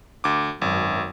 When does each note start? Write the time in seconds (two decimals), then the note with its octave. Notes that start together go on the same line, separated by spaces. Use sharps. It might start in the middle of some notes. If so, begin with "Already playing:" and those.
0.24 D2 D6
0.62 G#1 F#2